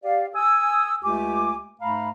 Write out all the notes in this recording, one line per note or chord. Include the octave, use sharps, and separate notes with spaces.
G4 D5 F5
G#5 D#6 E6
C#2 A3 G4 G#5 D6
G#2 A3 F5 A#5 B5